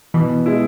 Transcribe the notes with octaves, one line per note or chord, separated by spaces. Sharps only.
B2 E3
G#3 E4